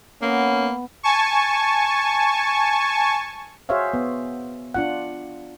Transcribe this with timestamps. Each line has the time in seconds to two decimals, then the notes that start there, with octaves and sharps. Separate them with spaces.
0.22 A#3 B3 C#4
1.03 G#5 A5 C#6
3.69 F#4 G#4 C5 C#5 E5 F5
3.94 B3
4.74 D4 F4 F#5